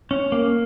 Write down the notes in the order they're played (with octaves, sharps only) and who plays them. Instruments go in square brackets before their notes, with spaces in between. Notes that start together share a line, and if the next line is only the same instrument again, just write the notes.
[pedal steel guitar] C#4
A#3